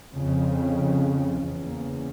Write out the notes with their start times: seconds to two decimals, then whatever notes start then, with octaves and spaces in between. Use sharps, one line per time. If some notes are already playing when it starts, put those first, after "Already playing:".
0.13 F2 C#3
1.35 E2 C#3
1.64 A#3